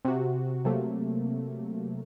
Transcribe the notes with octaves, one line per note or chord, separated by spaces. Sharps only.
C3 F#4
C3 F#3 A3 A#3